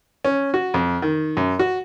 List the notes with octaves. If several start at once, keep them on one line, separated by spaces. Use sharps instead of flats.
C#4
F#4
F2
D#3
F#2
F#4